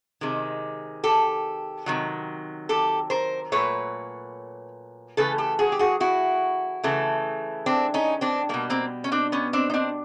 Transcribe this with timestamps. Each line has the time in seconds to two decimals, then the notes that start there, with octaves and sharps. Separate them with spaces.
0.21 C3 D#3 G#3
1.04 G4 A4
1.86 C3 D#3 F#3
2.69 G4 A4
3.10 A#4 C5
3.52 A#2 F#3 A3 B4 C#5
5.17 C#3 E3 A3 A4 B4
5.38 G4 A4
5.59 F#4 G#4
5.72 G4
5.79 F#4 G#4
6.00 E4 F#4
6.84 C#3 E3 A3
7.66 C4 D4
7.94 C#4 D#4
8.21 C4 D4
8.49 B2 G3 A#3
8.70 A#3 C4
9.04 C#4
9.12 C4 D4
9.32 B3 C#4
9.53 C4 D4
9.70 D#4
9.74 C4 D4